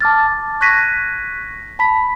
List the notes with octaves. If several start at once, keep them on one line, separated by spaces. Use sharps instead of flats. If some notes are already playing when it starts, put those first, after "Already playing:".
A5 D6 F6 A6
C#6 F#6 G#6 A#6 B6 D#7
A5 B5 B6